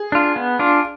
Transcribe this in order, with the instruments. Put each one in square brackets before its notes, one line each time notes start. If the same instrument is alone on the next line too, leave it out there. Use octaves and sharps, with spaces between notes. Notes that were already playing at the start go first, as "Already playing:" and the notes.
Already playing: [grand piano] G#4
[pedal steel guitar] D4 F4
B3
D4 F4